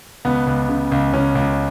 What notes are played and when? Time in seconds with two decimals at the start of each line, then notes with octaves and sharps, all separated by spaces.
0.25 C#2 B3
0.47 C#2
0.69 C#3
0.92 C#2
1.13 C#2 C#4
1.35 C#2